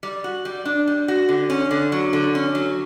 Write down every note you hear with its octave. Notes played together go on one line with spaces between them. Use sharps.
G3
F#4
G3
D4
G3
F#4
D3
C#4
D3
F#3
D3
C#4
F#3